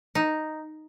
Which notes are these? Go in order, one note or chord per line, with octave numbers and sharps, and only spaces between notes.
D#4